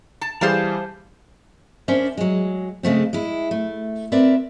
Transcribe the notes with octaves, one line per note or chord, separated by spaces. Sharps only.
A5
E3 G3 G#4 C5 F5 A5
C#4 D4 A#4 C5 D5 E5
F#3 G#3
C#3 G#3 A3 C4
G#3 E4
A3
C4 A#4 B4 D5 E5